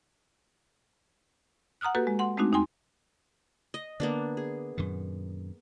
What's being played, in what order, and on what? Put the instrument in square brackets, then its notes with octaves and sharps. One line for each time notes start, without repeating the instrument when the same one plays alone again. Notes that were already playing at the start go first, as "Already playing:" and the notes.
[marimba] F#5 A#5 D#6 F6 F#6
A#3 F#4 G4 A4 B4
G#3
F#5 C6
G#3 A3 C4 D4 D#4 F#4
E2 D#4 G5 G#5 C6
[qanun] D#5
[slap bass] D3 [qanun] A#3 B3 D4
[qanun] G#4
[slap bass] F#2 A#2 D#3